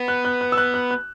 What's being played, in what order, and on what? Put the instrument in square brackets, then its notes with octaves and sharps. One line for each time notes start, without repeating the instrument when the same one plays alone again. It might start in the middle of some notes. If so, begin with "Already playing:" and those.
Already playing: [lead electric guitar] B3
[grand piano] F#6
F#6
F#6
E6
F#6
F#6
F#6